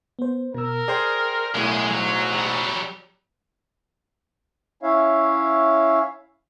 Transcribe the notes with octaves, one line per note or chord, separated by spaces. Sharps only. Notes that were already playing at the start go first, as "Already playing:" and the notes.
B3 C5
B2 A#4 E6
G#4 C5 D5 G5 C6
B1 F#2 A2 G#3 G#4
G#2 F#3
F#3 G3
C#4 E4 C#5 E5 F5